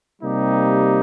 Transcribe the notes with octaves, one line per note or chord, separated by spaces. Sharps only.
C3 G3 A#3 D#4 G4